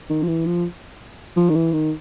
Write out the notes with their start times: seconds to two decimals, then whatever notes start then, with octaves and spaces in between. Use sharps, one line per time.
0.10 D#3
0.23 F3
0.28 E3
0.46 F3
1.37 F3
1.50 D#3
1.55 E3
1.73 D#3